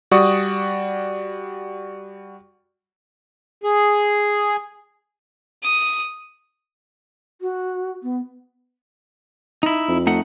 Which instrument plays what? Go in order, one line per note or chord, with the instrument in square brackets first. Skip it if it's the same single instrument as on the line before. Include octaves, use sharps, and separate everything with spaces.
[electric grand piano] G3 F#4 D5 C#6 D#6
[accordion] G#4
[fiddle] D#6
[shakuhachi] F#4
B3
[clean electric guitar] D#4 E4
[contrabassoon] F2
[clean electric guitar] A3 D#4 F#5